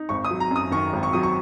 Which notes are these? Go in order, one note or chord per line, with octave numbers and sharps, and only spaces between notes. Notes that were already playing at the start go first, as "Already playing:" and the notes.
Already playing: D#4
G#1 C#6
D#6
F#3
A#5
F#2
D#6
D#3 C#6
G#1
C#6
F#3 D#6
C#6